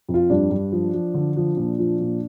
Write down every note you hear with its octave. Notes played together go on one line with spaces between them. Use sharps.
F2
F4
G2 D4
G2
F3
F3
D3
F3
A#2
F3
A#2